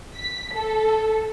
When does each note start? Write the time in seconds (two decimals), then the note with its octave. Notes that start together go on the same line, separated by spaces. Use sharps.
0.16 B6
0.54 A4